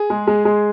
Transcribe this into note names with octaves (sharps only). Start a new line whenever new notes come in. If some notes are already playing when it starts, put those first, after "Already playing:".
Already playing: G#4
G#3
G#3
G#3